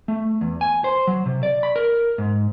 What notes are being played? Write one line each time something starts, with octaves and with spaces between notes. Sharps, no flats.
A3
E2
G#5
C5
F#3
C3
D5
B5
A#4
G#2